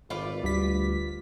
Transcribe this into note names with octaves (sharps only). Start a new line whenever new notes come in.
G#1 F4 B4 D5
D2 G3 B6